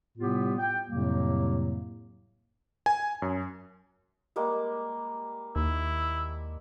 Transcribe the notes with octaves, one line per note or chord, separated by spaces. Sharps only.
A2 C3 G3 B3 F4 G4
G5
F2 A2 C3 F#3 G3 A#3
G#5
F#2
G3 G#3 A#3
D#2 E4